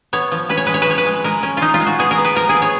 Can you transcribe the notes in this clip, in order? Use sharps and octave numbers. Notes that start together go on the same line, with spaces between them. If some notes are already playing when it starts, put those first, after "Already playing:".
B3 C#5
F3
C#4 B4
C#5
G#3 B4
C#5
B4
F3 C#5
B4
G#3
G#3 A#4
C#4
G#3 D#4 F4
F4
G#3
F#4
B3 G#4
A#4
B3
B4
F3 A#4
G#4
B3
C#5